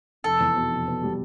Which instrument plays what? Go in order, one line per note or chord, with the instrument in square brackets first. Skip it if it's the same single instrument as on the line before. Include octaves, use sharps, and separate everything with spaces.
[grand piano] F1 [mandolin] A4
[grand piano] E2
B2
F1
B2
G3